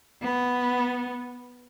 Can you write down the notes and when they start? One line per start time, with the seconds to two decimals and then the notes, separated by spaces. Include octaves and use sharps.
0.22 B3